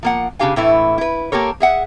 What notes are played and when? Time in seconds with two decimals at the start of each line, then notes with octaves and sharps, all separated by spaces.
0.03 F3 A#3 F#5
0.39 C#3 D4 D#4 G4 F5 G#5
0.56 A2 E3 A3 E4
0.98 E4 B4
1.32 A#3 G4 A4 A#4 C#5
1.60 G#4 E5 F#5